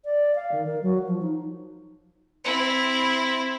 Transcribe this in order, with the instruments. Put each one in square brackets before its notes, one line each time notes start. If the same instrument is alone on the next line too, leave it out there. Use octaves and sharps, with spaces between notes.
[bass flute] D5
F5
D#3
A#4
F#3
F3
D#4
[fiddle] C4 E4